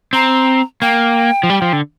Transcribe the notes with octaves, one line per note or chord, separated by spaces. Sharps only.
C4 A#5
A#3 G5
F3
G3
F3
D3